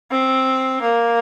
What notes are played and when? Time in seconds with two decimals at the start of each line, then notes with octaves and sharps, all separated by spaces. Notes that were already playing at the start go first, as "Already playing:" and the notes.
0.11 C4
0.82 A#3